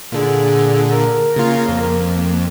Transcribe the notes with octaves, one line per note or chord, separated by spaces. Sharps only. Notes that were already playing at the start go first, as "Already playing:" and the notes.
A#2 D3 G#4
A#4
C#3 A#3 F4
F2